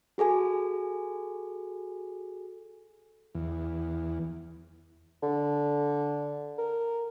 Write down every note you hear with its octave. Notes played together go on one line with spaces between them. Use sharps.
F#4 G#4 A4 G#5
E2
D3
A#4